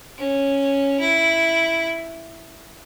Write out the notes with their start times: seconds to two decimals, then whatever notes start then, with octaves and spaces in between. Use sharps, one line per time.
0.18 C#4
1.00 E4